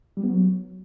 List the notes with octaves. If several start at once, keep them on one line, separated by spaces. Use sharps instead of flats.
G3
B3
F#3